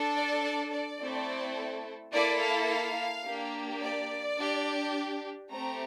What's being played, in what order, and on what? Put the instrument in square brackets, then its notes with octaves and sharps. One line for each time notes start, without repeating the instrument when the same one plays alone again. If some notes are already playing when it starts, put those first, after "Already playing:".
Already playing: [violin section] D4 A4
D5
D5
D5
A3 C4 E4 A4
A#3 E4 A4 D5
F5
F5
A#3 D4 G4
D5
D4 G4
A3 C4 G4 A#5